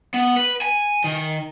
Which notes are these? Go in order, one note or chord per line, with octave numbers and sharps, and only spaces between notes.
B3
B4
G#5
D#3